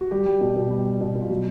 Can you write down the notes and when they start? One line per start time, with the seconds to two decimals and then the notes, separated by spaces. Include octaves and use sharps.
0.01 F#4
0.11 G3 G4
0.26 G3
0.41 B2
0.56 B2
0.70 G3
0.85 G3
1.00 B2
1.15 B2
1.22 F4
1.30 F#3 F#4